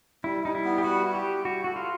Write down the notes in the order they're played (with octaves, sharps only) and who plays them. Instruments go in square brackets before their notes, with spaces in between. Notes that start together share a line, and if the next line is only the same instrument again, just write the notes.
[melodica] G3 [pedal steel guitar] E4
[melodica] G3 [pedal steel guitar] D#4
[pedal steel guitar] E4
[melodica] B3
[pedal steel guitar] G4
[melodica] G3 [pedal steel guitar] F#4
[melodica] E4
[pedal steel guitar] G4
[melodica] G3
[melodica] E4 [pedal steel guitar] F#4
[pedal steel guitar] F#4 [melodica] A4
[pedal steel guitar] F4